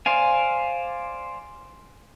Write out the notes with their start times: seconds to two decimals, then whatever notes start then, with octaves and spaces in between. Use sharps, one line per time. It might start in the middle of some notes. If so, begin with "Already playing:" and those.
0.06 C5 D5 F5 G#5